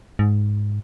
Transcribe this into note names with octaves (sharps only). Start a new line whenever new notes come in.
G#2